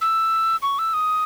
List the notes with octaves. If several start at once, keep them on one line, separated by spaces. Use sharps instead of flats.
E6
C#6
E6
D#6